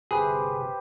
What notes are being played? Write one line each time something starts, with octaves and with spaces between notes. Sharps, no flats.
G1 C3 G4 G#4 B4 C5